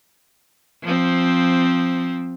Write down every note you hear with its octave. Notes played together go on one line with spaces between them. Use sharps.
F3 C4